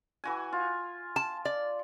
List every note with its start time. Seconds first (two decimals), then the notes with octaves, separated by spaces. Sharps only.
0.24 E3 F#4 G#5
0.53 F4
1.16 A5
1.45 D5